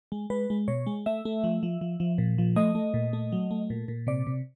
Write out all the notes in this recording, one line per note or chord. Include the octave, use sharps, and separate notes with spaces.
G#3
G#3 B4
G#3
B2 C#5
G#3
A3 E5
A3
F3
F3
F3
F3
A#2
F3
A3 D#5
A3
A#2
A3
F#3
A3
A#2
A#2
C3 D5
C3